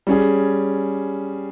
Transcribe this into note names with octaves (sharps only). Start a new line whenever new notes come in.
G3 C#4 G#4